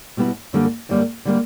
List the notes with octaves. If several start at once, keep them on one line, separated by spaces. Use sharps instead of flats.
B2 G3 B3 E4
F#2 D3 G3 A#3
F#2 D3 G3 A#3
D3 G3 A#3